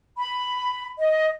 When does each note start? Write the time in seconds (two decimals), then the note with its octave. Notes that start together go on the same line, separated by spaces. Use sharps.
0.17 B5
0.99 D#5